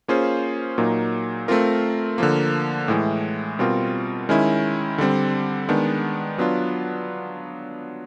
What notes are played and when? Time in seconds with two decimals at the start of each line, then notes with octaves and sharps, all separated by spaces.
0.08 A#3 C#4 F4 G#4 C5
0.78 A#2 F#3 A#3 D#4
1.48 A3 C4 F4 A#4
2.18 D3 F3 A#3
2.88 A2 E3 G#3
3.59 B2 G3 C4 F4 A#4
4.29 D#3 G#3 C#4 E4
4.98 D3 G3 C4
5.69 D#3 G#3 B3 D4
6.38 F#3 B3 D4 F4